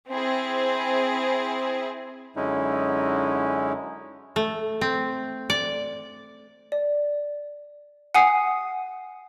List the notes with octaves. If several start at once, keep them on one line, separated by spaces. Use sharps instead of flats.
C4 E4 G#4
F#2 D3 G#3 C#4 D#4 E4
A3
C4
D5
D5
F#5 G#5 D#6 C7